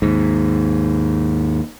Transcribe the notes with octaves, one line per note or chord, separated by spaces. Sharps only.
D#2 G#2